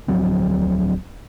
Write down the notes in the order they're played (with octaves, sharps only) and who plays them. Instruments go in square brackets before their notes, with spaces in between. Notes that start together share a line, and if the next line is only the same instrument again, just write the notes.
[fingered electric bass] D1 F3 F#3 C4